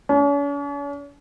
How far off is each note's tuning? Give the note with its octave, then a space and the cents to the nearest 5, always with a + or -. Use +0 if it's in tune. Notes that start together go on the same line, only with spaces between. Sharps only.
C#4 +45